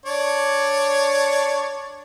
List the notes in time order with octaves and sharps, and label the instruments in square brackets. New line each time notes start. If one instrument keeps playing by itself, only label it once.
[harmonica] D4 C#5 D5